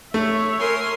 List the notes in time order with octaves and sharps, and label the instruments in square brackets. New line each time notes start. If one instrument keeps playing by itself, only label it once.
[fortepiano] A3 [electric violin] C#5 E5
[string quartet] A#4 G#5 C6